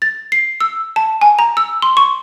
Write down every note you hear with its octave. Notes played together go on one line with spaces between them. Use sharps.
A6
C7
E6
A5
G#5
A#5
E6
C6
C#6